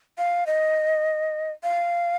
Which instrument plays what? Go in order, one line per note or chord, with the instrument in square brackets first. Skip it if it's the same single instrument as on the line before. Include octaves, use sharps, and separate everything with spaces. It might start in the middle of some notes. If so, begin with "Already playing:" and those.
[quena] F5
D#5
F5